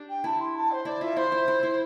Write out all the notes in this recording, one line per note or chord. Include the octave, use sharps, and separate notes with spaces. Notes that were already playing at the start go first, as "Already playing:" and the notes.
Already playing: D4 G4
G5
E4 A5
C6
A5
C5
E4 D5
F4 E5
E4 C5
E4
E4
E4